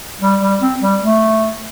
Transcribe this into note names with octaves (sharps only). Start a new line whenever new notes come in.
G3
G3
C4
G3
A3